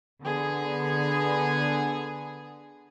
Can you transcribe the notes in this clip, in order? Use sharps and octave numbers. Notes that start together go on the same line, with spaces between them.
D3 B3 G#4